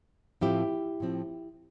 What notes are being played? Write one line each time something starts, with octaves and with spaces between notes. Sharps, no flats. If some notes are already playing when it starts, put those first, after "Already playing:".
A2 F3 C4 E4 G4
A2 F3 C4